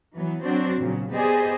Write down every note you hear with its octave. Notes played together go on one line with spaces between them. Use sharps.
E3 F#3 B3
F#3 C4 D4 F#4 C5 D5
A#2 C#3 F#3
B3 G4 G#4 C5 D5 D#5